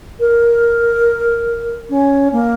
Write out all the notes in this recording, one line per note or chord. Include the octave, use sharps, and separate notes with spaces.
A#4
C#4
A#3